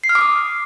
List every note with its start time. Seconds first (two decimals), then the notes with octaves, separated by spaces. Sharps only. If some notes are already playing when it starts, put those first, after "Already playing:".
0.04 C7
0.09 F6
0.15 D6
0.21 D#6